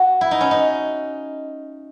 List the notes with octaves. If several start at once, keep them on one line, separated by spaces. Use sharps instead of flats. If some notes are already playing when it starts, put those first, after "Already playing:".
Already playing: F#4
E4
D#4
C#4
D#4